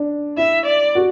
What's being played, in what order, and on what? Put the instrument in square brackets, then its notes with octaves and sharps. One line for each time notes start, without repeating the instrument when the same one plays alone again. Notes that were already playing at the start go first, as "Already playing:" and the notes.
Already playing: [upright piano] D4
[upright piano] E4 [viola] E5
[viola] D5
[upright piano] F#4